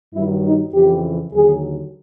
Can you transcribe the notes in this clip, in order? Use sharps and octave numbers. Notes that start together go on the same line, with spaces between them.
G2 D#3 F#3 E4
D#4
F2 C#3 E3 G4
D#2 D3 F#3 G#4